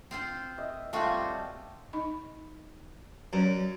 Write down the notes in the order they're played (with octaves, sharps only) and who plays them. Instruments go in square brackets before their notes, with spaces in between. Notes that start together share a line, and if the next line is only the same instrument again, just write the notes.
[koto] C4 F4 C5
[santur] D#5 [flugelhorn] E5
[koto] G3 C4 F#4 [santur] A3 A5 [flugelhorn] F4
[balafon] D#4 D#5 B5
[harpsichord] F#2 [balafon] C#5 D5 A#5